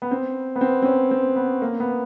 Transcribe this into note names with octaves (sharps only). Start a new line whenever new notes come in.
B3
C4
B3
C4
C4
C#4
C4
B3
A#3
B3